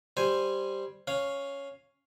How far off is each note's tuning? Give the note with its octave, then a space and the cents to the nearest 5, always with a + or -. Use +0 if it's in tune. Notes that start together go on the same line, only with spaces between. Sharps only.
G3 +0 C5 +0 G#5 +0
C#4 +0 F5 +0